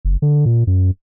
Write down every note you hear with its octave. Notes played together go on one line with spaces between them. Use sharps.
F#1
D3
A#2
F#2